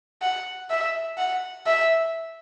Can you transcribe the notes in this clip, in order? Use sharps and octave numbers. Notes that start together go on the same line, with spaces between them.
F#5
E5
F#5
E5